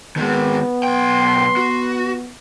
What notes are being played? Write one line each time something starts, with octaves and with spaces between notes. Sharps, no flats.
D#3 G#3 B3
B1 G5 C6
F#4